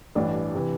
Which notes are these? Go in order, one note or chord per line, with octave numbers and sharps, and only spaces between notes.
A1 G2 E3 D4
C3 E3